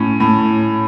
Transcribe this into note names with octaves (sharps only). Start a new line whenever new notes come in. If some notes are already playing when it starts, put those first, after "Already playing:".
Already playing: A2 C#4
A2